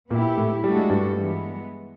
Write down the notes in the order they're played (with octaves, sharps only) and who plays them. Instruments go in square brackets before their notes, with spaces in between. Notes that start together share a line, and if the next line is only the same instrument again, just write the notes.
[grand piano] A#2 A#3 [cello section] B3 E4 G4
[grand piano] A2 A3
[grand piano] G3 [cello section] A3 D4 F#4 A4
[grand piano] G#3
G2 G3
[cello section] E3 G#3 B3